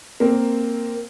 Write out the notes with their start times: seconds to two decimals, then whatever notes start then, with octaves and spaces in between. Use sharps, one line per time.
0.20 A#3 C4